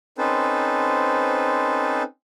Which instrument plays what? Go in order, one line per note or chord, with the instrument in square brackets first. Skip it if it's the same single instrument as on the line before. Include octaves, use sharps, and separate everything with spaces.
[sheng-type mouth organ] C4 C#4 D#4 A4 B4 C5